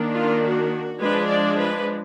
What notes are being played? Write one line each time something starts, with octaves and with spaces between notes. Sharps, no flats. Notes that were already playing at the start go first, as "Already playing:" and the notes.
Already playing: D#3 A#3 D4
F4
F#4
F3 G#3 D4 B4
D5
B4